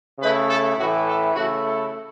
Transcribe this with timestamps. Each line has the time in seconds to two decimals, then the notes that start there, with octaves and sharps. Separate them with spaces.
0.19 C#3 A3 E4 B4
0.48 A4
0.77 A2 E3 A3 F#4
1.06 A4
1.35 C#3 A3 E4 F#4
1.65 A4